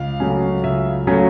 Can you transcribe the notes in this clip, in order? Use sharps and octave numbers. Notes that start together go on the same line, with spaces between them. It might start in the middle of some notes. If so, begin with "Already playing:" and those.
Already playing: C#2 F5
C#3 F#3 A3 C#4
C#2 E5
C#3 F#3 A3 C#4